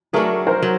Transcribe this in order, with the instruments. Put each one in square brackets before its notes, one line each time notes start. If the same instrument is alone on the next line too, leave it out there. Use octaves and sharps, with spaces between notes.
[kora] F#3 A3 D4 F#4 [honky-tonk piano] G#4 A#4
[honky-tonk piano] A#4 C5
[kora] F#3